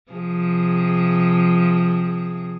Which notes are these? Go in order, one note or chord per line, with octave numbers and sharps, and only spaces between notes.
C3 F3 G#4